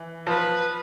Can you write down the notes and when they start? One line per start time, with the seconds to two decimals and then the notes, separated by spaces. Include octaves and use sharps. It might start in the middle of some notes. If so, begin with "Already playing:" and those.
Already playing: E3
0.27 F3 B4